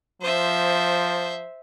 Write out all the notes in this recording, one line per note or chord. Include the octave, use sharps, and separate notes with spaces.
F3 C5 E5